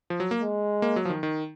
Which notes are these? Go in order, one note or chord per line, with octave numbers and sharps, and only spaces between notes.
F3
F#3
A#3
G#3
A#3
F#3
F3
D#3
D#3